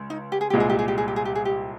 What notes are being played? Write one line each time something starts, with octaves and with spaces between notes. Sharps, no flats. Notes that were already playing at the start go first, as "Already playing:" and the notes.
Already playing: C#2
D#4
G4
G#4
C2 A#2 G#3 G4
G#4
G4
G#4
G4
G#4
G4
G#4
G4
G#4
G4